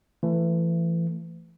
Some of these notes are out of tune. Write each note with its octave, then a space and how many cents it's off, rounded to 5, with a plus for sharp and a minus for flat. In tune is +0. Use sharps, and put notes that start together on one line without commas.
E3 +30 A3 +20